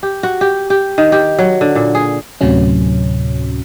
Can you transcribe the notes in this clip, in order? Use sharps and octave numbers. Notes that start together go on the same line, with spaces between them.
G4
F#4
G4
G4
D#3
G4
F#3
D3
A#2
G#4
D2 A2 C3 F#3 C#4